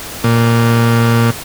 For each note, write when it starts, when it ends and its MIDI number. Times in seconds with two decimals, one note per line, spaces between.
0.24 1.30 46